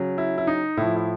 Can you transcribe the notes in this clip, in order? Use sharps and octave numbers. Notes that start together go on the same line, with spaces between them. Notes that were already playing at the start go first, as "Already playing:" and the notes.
Already playing: C#3 F#3
E4
E4
D#4
A2 F3 E4
E4